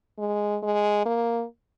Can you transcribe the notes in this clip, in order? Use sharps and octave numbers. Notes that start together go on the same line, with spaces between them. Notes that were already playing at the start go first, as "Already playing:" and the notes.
G#3
G#3
A#3